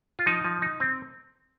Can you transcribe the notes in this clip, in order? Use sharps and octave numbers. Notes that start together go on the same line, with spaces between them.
F4
F3 D#4
F3
D#4
C4